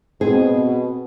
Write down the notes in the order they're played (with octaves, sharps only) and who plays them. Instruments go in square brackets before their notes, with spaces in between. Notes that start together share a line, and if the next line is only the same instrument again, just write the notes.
[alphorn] B2 [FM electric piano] C4 [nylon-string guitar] G#4